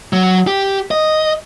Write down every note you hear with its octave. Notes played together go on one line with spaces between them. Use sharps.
F#3
G4
D#5